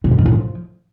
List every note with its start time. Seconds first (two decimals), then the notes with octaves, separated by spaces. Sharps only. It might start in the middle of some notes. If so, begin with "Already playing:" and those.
0.04 C3
0.11 G#2
0.18 D#3
0.26 A2
0.33 F3